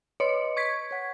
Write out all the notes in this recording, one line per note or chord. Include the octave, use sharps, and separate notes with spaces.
B4 C#5 D#5 C6 C#7
C#6 G#6 B6
C#5 F#5